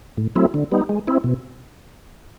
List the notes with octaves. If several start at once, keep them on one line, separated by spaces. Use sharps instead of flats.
A2
F#3 A3 C4 E4
D3
G3 B3 D#4
G#3
C4 E4
B2